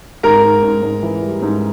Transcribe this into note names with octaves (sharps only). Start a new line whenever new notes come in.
G#2 A#4 A#5
G#2
G#2
G#2
E3
G3
G#2